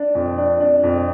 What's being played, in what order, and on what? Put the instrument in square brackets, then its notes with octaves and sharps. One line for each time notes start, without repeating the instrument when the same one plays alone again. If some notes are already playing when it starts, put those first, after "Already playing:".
Already playing: [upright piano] D4
F2
D4
D4
F2